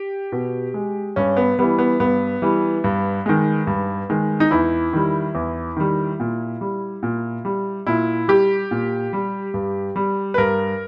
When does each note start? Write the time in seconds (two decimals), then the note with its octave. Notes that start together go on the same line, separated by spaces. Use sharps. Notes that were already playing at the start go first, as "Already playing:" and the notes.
Already playing: G4
0.32 B2
0.74 G#3
1.16 G2 C#4
1.37 B3
1.59 E3 G3 B3
1.79 B3
2.00 G2 B3
2.42 E3 G3
2.84 G2
3.26 D#3 G#3
3.67 G2
4.10 D#3 G#3
4.40 D#4
4.51 E2 E4
4.93 D#3 G3
5.35 E2
5.77 D#3 G3
6.20 A#2
6.61 G3
7.03 A#2
7.45 G3
7.87 A#2 E4
8.28 G3 G4
8.71 A#2
9.13 G3
9.54 G2
9.96 G3
10.34 B4
10.38 G2 A#4